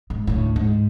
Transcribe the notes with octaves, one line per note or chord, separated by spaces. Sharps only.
G#2
D2 A2
G#2